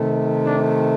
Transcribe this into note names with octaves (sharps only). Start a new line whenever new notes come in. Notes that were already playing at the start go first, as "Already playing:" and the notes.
Already playing: C3 D#3 A3
D4